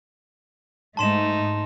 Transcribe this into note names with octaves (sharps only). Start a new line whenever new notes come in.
G#2 A3 D#4 A5 C6 E7